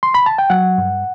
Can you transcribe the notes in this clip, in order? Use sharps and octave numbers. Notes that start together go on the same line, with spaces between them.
C6
B5
A5
G5
F#3 F#5
G2